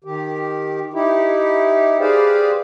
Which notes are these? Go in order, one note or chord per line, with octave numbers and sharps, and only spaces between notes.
D#3 G4
D#4 E4 G4
G4 G#4 B4 C5 D5 F5